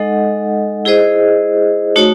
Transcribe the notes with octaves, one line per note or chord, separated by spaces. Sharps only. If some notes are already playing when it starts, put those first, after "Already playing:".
Already playing: G#3 D#4 A4 D#5 F#5
E4 G#4 C5 D#5
A3 D#4 F#4 C#5